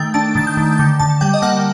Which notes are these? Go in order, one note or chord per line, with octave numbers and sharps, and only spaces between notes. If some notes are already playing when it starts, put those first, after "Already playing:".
Already playing: D#3 A3 G5
D4 A5
D#3 A6
G6
D#3
D3 G6
D3 A5
G3 G5
D#5
A#3 F#5